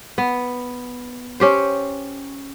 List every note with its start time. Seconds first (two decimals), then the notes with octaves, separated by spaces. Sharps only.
0.18 B3
1.40 C#4 G4 C5